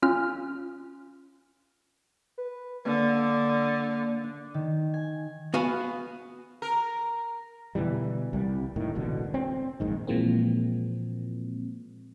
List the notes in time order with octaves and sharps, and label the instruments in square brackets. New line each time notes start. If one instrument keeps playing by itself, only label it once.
[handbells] C#4 F4 F6
[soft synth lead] B4
[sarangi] D3 [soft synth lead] A#3
[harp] D4
D#3
G#5
[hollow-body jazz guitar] B3 F#4 F5 G#5
[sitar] A#4
[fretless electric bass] B2 D3 E3 G3
C2 G3
A2 D#3
E1 A1 B2 D3
C4
A#1 G#2 D#3
[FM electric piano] A#2 E3 F3 G#3 A#3 C4